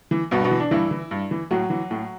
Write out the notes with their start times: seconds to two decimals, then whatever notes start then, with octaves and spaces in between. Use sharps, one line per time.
0.11 E3
0.31 G2 B2 B3
0.44 B2 B3
0.51 E3
0.60 D4
0.71 G2 E3 E4
0.91 E3
1.11 G2
1.31 E3
1.51 A2 F#3 F#4
1.70 E3
1.91 A2